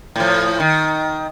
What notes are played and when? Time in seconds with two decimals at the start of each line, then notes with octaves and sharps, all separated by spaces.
0.16 A2 F3
0.60 D#3